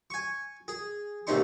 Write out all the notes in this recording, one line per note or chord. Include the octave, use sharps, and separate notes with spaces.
G#5 C#6
G#4
A1 D#2 C3 D#4 C6 C#6